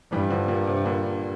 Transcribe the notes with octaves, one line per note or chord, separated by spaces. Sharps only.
G2 E3 G3
D3 F3
A#2 D3
C3
A#2 D3